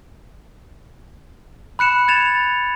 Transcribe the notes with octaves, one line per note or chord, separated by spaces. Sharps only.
B5 F#6 C#7 E7
G#6 A6 E7 F7